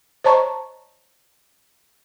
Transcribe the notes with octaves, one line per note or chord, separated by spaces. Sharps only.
C5 C#5 D#5 A5 A#5 C#6